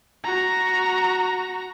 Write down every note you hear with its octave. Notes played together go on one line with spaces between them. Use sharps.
F#4 A#5